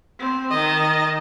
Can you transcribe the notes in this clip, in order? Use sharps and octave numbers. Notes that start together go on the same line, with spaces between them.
C4
D#3 D#5